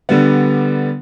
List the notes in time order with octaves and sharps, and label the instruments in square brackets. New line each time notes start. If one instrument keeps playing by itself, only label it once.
[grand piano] D3 G3 B3